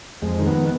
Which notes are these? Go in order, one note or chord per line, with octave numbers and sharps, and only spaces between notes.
F2 G#3
D#3
B3